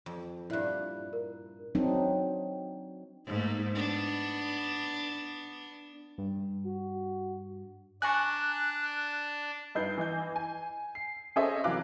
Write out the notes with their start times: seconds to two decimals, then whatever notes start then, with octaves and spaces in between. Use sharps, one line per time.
0.06 F2
0.50 G2 A#2 E4 E5 F#6
1.13 A#4
1.75 F#3 C4 D4 D#4
3.26 G#2 A3 A#3
3.71 B3 D4
6.18 G2
6.67 F#4
8.02 D4 G#5 A#5 C#6 F#6
9.75 G2 D#4 B4 G6 C7
9.98 E3 D#5 G6
10.36 G#5
10.95 C7
11.36 C#4 G#4 A4 C5 D#5 E5
11.64 F1 E3 F#3 F5 D6 F#6